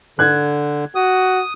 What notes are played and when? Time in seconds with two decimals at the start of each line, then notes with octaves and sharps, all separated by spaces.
0.19 D3 F#6 G#6
0.95 F#4 D#6